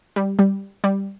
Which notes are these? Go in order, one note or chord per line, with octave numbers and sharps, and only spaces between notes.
G3
G3
G3